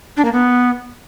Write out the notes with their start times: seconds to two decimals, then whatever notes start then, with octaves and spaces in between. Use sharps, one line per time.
0.17 D4
0.25 A#3
0.33 B3